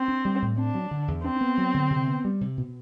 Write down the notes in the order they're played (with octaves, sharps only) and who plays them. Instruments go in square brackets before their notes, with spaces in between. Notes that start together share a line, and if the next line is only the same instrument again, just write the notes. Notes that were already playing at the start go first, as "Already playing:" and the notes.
Already playing: [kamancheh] C4
[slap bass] D4
G3
A2
[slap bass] C4 [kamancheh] D4
[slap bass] F#3
D3
E2
[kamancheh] C4 [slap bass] D4
[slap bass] B3
F#3
D3
C3
B3
G3
C3
B2